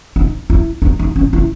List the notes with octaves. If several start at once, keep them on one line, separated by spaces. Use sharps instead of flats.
D#4
E4
D#4
D#4
C#4
E4